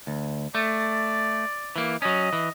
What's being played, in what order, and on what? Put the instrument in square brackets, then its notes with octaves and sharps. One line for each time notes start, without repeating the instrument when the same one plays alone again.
[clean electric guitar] D2
[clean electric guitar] A3 [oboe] D5
[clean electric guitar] E3 A#3
[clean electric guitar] F#3 C#4 [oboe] D#5
[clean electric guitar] E3